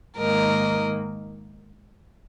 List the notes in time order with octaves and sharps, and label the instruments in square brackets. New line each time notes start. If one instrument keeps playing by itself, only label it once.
[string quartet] G#2 D#3 A#3 A#4 D#5